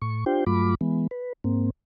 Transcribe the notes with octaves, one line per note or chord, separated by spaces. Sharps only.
A2 C#6
D4 F4 G4 C5 G5
G2 F#3 A3 F4 B5 D6
E3 G#3 B3
B4
G#2 A#3 C4